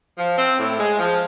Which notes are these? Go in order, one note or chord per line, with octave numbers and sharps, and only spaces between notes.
F3
C4
A2
G#3
F3